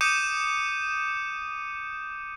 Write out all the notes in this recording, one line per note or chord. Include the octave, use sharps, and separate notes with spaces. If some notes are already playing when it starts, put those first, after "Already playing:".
D6 D#6 G6 C#7 D#7 E7